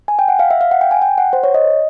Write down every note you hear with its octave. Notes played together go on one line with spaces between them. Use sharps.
G#5
G5
F#5
F5
E5
F5
F#5
G5
G#5
G5
F#5
C5
C#5
D#5